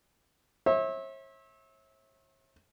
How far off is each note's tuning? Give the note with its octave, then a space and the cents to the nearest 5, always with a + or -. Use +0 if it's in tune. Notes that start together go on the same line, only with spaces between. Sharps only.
C#5 -45 E5 -25